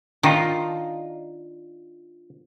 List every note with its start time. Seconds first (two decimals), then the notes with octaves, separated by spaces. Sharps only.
0.23 D#3 D4 D#4 F4